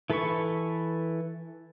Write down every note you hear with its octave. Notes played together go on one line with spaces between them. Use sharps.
E3 A4 B4 B5 C#6